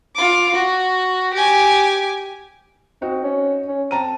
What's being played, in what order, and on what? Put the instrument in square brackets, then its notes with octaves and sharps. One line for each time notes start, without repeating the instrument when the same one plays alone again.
[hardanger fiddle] F4 D6
F#4
G4 G#5
[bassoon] C4 [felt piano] D#4 F#4
[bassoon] C#4
C#4
[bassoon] C4 [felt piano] A5 A#5 D#7